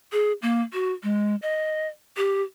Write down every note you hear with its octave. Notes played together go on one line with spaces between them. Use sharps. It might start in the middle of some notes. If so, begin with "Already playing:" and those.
G#4
A#3
F#4
G#3
D#5
G4